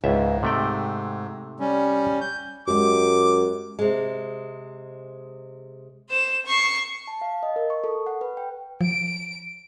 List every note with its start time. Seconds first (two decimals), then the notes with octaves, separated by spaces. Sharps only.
0.04 C#2 G#2 E5
0.43 C3 A3 G5
1.60 G3 C#4
2.21 G6
2.68 F#2 G#3 G4 D6
3.79 C3 G#3
6.10 C5 E7
6.46 C#6 C7
7.07 A5
7.21 F5
7.43 D#5
7.56 A#4
7.70 C#6
7.84 A4
8.06 F#5
8.21 B4
8.37 G5
8.81 F3 D7